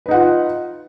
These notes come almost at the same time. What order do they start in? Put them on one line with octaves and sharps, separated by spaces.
B4 D#4 F#5 F4